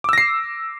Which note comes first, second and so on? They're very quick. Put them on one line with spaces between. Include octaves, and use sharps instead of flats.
D6 E6 A#6 C7